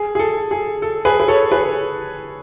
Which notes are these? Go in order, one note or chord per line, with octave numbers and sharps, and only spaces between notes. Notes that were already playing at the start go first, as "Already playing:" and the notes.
Already playing: G#4
G#4
A4
G#4
A4
G#4 B4
B4
A4 C#5
G#4 B4